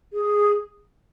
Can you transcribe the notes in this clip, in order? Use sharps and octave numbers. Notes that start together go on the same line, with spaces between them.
G#4